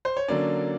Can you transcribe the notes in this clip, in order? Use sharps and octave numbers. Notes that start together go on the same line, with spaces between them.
C5
C#5
D3 F#3 A#3 C#4 D5